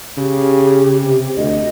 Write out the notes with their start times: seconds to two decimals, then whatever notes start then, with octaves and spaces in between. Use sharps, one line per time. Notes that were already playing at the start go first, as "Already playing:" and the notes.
0.17 C#3 G4
1.03 C3
1.36 D2 D#5